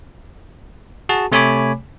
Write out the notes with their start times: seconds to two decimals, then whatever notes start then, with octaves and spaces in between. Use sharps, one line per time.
1.09 F#4 G#4 A5
1.32 C3 A3 C#5 G#5 B5 D6